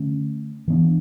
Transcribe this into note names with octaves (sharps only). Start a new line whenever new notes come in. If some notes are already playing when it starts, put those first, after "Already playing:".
Already playing: D3 A3 C#4
E3 B3 D4